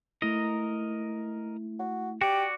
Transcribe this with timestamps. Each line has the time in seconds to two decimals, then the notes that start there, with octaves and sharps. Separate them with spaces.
0.22 A3 E4 A#4 D#5 A#5
1.79 F#4
2.21 F#4 G4 D5